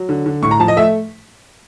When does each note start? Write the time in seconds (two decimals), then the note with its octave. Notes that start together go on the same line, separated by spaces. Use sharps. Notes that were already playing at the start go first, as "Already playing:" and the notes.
Already playing: F#3
0.09 D3
0.26 D3
0.42 A2 C#6
0.51 A#5
0.60 F3 A5
0.68 D#5
0.77 A3 E5